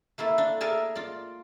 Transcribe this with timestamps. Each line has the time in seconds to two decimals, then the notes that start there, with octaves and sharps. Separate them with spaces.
0.18 A3 A#3 E4 A4
0.38 D4
0.61 G#4 A#4 D5 E5 G#5
0.95 F4 D5